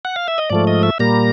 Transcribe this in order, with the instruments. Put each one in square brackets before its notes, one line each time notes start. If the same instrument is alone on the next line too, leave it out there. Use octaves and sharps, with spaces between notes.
[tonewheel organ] F#5
F5
E5
D#5
G#2 F3 A3 D5
D#5
E5
A#2 G3 A#3 A#5